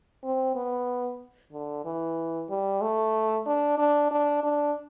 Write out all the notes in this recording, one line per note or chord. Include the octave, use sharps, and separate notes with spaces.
C4
B3
D3
E3
G3
A3
D4
D4
D4
D4